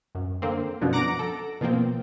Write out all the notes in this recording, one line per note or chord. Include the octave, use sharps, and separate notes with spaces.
F#2
D3 A#3 C4
F#2 B2 D3 F3 F#3
F#5 A#5 D6 A#6 D7
A4
B2 F3 A#3 C4